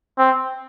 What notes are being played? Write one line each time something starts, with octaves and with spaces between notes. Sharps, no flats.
C4